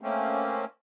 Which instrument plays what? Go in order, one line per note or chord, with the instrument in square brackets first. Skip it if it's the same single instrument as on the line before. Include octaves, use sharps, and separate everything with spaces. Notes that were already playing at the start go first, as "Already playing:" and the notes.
[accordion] A3 A#3 C4 C#4